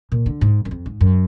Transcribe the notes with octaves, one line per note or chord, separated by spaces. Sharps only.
A#2
D3
G#2
F#2
F2
G#2
F#2